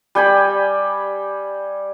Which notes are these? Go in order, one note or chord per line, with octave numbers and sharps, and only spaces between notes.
G3 G5 G#5 B5